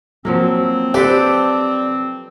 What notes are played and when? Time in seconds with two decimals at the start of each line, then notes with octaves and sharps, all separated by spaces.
0.25 F3 F#3 A#3 C4
0.94 D4 G4 A4 B4 C5